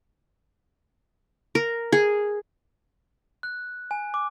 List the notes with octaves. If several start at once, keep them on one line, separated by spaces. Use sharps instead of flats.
A#4
G#4
F#6
G#5
D6